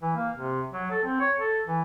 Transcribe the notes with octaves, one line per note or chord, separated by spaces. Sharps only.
E3
A#3
C3
F#3
A4
C4
C#5
A4
E3